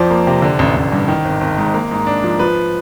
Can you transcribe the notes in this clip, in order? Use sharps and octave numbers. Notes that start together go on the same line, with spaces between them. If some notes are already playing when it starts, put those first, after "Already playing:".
Already playing: F2 F3 C5 D5
A#3
C3
D3
A1
A1
G2
D#3
G#1
G#1
G#2
A#3
G#2
D4
F3
F3 B4